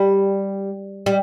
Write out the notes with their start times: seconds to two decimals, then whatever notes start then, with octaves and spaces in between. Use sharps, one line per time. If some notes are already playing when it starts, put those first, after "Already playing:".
Already playing: G3
1.06 G3